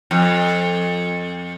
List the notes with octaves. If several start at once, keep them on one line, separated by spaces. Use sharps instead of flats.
F2